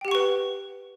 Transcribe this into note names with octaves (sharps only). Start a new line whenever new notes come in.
G4 B4 F#5 G5 C#6